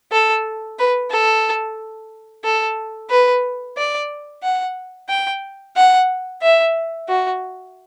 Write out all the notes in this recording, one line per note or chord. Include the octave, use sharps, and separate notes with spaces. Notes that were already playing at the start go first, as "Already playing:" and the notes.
A4
B4
A4
A4
B4
D5
F#5
G5
F#5
E5
F#4